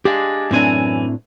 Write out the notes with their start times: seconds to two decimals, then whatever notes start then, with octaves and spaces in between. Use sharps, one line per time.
0.05 G#3 D4 G4 F5
0.51 F#2 A2 E3 C4 D4 G#5